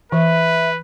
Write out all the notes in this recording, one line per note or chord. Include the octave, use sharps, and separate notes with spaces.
E3 B4 E5